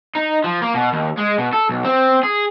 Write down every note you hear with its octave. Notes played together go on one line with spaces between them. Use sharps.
D#4
F3
A#3
B2
D#2
G#3
B2
A4
B1
C4
G#4